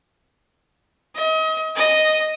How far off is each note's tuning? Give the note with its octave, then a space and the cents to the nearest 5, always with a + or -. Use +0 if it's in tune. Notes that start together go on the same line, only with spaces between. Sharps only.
D#5 +35
D#5 +0